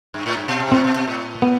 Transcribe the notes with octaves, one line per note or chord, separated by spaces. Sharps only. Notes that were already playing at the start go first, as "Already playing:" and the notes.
G2
A2
G2
B2
C3
G2
A2 C4
B2
B2
A2
B3